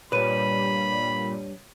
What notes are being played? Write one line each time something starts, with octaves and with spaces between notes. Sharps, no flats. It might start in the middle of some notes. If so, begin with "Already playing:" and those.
G2 A#2 G3 B4 C#5 B5 D#7